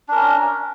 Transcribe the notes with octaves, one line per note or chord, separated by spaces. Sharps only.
C#4 D4 A#4